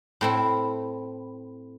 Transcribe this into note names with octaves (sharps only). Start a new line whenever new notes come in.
A2 C4 E4